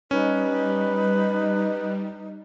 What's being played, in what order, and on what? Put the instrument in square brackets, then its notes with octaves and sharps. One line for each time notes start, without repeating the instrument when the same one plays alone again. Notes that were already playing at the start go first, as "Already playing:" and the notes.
[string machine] G3 [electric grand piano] C#4 [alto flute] D#4 [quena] B4